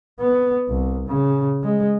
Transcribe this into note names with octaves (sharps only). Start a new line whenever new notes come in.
B3
C2
C#3
G#3